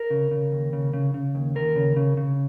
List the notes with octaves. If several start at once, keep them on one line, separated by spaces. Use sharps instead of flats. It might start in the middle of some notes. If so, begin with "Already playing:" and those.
Already playing: A#4
C#3
C#3
D#2
C#3
C#3
C#3
D#2
D#2 A#4
C#3
C#3
C#3